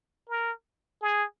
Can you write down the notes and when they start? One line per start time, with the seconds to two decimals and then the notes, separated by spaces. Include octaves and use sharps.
0.30 A#4
1.02 G#4